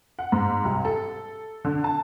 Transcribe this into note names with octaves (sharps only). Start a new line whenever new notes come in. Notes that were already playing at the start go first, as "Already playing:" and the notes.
F#5
G#2
C2
A4
D3
A5